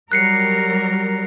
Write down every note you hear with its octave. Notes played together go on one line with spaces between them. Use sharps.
F#3 G3 A#4 F#6 C7 C#7